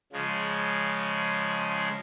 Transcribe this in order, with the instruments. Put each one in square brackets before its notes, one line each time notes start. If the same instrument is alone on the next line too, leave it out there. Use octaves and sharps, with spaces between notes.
[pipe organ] C#3 F3 G#3